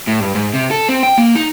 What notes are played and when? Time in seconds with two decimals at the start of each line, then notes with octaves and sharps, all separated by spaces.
0.07 A2
0.20 G2
0.35 G#2
0.54 C3
0.71 A4
0.89 C4
1.03 G5
1.18 A#3
1.35 D#4